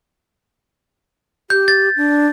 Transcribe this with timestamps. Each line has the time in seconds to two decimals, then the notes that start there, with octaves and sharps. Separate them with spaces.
1.50 G4 G6
1.68 A6
1.97 D4